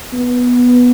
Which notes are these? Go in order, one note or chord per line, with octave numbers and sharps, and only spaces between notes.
B3